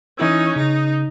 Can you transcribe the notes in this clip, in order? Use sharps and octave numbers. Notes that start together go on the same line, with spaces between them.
E3 C#4 D#4 E4 E6
C#3 D#4